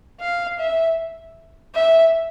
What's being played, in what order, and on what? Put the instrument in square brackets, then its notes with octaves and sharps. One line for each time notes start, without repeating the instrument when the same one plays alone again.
[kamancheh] F5
E5
E5